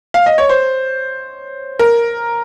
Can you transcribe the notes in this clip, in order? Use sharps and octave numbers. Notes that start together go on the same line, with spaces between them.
F5
D#5
C#5
C5
A#4